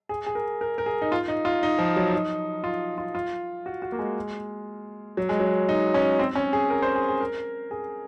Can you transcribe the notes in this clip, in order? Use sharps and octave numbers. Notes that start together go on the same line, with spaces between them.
G#4
G#4
A#4
A#4
A#4
G#4
D#4
F4
D#4
F4
D#4
F3
F#3
D#4
F4
F4
F4
F#4
F#4
A#3
G#3
F#3
G#3
F#3
D#4
C#4
C4
C#4
G#4
A#4
C5
G#4
G#4
A#4
G#4